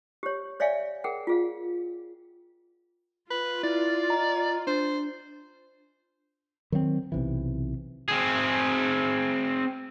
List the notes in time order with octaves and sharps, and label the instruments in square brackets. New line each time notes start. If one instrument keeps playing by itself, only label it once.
[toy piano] G4 C#5
C#5 D5 E5 F5 G#5
G#4 A#4 F#5 G5
F4 G#4 F5
[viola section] F4 [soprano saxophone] B4
[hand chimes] E4 A6 [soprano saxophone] D5
[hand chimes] D#5 A#5
[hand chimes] D4 [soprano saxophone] C5
[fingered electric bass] D#3 F#3 A3 C4
B1 C3 E3
[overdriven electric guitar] C4 G#4